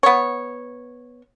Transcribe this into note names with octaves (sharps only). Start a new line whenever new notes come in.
B3 C#5